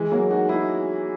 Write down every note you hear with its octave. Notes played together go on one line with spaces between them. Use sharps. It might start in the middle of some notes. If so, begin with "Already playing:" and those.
Already playing: E3 G#3
F#3 A#3
D#4 F#4
E4 G#4